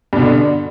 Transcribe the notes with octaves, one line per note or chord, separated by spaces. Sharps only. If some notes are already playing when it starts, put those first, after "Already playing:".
G2 B2 D3